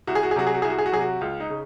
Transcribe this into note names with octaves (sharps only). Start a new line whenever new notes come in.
C2 F#4
G#4
F#4
G#4
C3 F#3 F#4
G#4
F#4
C2 G#4
F#4
G#4
F#4
C3 F#3 G#4
F#4
C#2 F4
D#4
C#3